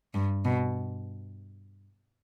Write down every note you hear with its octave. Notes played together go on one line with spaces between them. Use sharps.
G2
B2